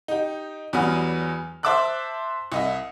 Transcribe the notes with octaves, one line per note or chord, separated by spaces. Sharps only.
D#4 G4
E2 F#3 G3 B3 G#5 F6
C5 E5 A5 D6 E6 F#6
C2 D#5 E5